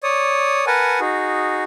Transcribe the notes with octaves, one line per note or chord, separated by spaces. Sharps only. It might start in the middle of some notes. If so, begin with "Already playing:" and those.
C#5 D5 D#6
A#4 B4 F#5 G#5 A5
D#4 F#4 G#4